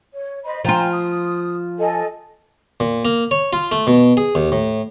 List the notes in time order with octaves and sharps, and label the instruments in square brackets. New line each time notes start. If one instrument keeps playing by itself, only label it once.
[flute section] C#5
C5 D#5 B5
[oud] F3 F4 [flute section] G5 G#5 A#5
[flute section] D#6
A4 D#5 G#5
[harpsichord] A#2
A#3
C#5
F4
A3
B2
G#4
D#2
A2